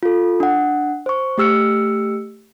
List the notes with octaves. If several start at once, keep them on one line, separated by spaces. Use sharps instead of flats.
F4 A4
D4 F#5
C5 C#6
A3 G4 E6 F6 C#7